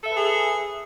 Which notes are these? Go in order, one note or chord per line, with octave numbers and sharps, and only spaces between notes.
G#4 A4 B4 E5